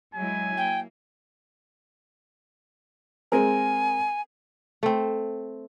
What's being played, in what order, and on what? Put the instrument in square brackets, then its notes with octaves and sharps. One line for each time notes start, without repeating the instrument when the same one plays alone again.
[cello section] F#3 G#3 E4 [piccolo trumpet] G#5
[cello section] A#3 [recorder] G5
[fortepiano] G#3 C4 A#4 [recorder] G#5
[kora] A3 C4